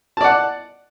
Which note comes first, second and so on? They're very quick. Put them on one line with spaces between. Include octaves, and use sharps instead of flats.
A5 D5 F#5